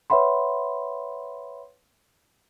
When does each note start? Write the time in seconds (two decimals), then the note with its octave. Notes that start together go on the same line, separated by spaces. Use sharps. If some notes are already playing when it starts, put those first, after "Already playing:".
0.10 B4 C#5 E5 F#5 B5 C6